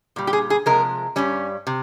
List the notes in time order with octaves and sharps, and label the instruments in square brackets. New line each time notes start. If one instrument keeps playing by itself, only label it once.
[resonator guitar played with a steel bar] A#2 G3
G4
G#4
G#4
C3 F3 G#3 A#4
G2 G3 C#4
C3